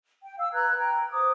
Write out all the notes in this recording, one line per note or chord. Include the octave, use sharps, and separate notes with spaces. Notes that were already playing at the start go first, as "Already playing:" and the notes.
G5
F5 E6
B4 A#5 F#6 G#6
G5 A#5
C5 D6 D#6